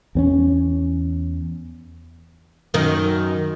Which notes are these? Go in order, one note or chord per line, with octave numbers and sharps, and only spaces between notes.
E2 C4 C#4
F#2 D#3